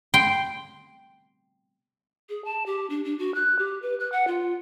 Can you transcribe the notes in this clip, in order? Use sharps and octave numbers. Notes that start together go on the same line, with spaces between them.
G5 C6
G#4
A5
G4
D4
D4
F#4
F#6
G4
B4
F#6
F#5
F4